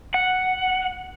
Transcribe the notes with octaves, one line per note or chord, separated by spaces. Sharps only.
F#5